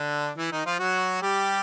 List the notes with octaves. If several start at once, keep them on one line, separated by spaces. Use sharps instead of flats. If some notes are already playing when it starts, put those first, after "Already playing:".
Already playing: D3 D4
E3 E4
D#3 D#4
F3 F4
F#3 F#4
G3 G4